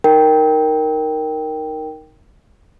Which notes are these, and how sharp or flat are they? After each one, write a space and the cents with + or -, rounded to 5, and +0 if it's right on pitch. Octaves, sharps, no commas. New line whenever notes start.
D#4 +0 A#4 +0 G5 +0